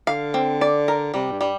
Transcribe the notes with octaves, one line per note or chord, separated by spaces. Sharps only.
D3 F5
C4
D5
A#4
C3 G3
G2
G3